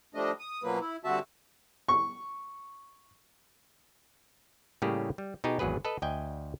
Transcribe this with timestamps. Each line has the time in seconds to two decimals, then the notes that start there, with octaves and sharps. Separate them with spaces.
0.15 F3 G3 A3 D4 D#5
0.40 D#6
0.63 F#2 B2 F3 F#3 A#3 B4
0.80 E4
1.05 G2 D3 C4 F#4 E5 A5
1.89 C#6
4.82 A2 C#3 G3 A#3 G4 G#4
5.18 G3
5.44 B2 D#4 G4 G#4
5.59 G#1 E2 F#3 G#4 B4
5.85 A4 B4 D#5
6.02 D2 D#5 G5 G#5